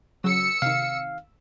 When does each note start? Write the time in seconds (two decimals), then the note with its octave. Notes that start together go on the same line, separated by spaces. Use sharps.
0.24 C#3 F#3 E6 C#7
0.62 C3 D#3 F5